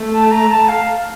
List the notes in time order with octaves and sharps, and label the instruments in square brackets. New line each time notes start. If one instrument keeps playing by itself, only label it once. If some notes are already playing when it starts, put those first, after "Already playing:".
Already playing: [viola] A3
[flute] A5
A#5
A5
F5